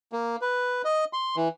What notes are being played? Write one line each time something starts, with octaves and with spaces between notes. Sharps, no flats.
A#3
B4
D#5
C6
E3